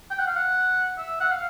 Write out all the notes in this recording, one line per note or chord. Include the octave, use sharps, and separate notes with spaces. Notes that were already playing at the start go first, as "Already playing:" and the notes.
G5
F#5
F5
F#5
E5
F#5
F5